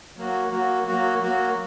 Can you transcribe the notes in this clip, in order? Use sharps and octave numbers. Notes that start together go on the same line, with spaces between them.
F#3 A#3 F#4
F#3 A#3 F#4
F#3 A#3 F#4
F#3 A#3 F#4